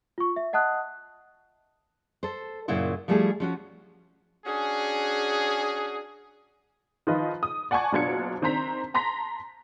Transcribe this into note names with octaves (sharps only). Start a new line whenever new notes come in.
F4 C#6
E5
D#5 F#5 A5 D#6 F#6
A4 C5
F#2 A#2 C#3 E4 F4
F3 G3 A3 E4 G#4
F3 C#4 F#4
C#4 D4 F#4 G#4
D#3 F3 F4 B4 D#5
D#6
D5 F#5 G#5 A5 C#6 G#6
F#1 B2 D4 F4 G#6 C#7
D#3 C4 D4 C5 A#5 B6
A5 A#5 C6 A#6 B6